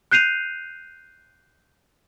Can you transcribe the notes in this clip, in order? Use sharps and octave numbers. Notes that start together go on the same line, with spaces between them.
F#6 G6 C7 D#7 F7